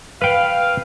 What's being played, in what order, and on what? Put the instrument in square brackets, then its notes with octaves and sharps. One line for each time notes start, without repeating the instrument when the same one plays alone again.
[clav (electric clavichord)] B4 G5 [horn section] F5